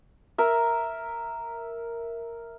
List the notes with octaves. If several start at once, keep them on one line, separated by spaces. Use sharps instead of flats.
A#4 E5